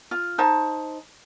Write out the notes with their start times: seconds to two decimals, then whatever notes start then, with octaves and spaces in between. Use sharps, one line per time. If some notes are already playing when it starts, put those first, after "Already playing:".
0.11 F4
0.38 D#4 C5 A5